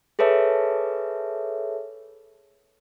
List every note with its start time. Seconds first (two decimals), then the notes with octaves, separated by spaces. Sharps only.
0.19 G#4 A4 B4 C#5 E5 A5